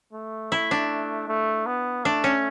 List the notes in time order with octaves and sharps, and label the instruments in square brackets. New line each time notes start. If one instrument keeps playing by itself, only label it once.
[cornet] A3
[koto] E4
D4
[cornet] A3
B3
[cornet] A3 [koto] D4
[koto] C#4